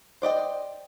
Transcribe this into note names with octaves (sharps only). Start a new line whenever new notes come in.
C5 D5 D#5 G5